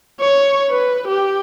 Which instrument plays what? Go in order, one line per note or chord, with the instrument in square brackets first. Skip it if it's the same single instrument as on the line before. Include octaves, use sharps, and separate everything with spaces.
[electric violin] C#5
B4
G4